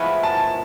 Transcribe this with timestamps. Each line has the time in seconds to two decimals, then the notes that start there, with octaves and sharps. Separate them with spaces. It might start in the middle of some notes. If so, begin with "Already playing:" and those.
Already playing: A2 F3 G#3 B3 E4
0.23 A5